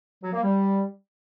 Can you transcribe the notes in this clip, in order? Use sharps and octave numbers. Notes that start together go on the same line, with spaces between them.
F#3
A#3
G3